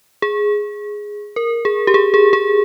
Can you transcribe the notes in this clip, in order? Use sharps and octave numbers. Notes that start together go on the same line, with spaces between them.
G#4
A#4
G#4
G4
G#4
G#4
G#4